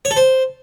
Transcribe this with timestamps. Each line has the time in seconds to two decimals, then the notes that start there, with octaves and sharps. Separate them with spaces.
0.05 C#5
0.11 A4
0.17 C5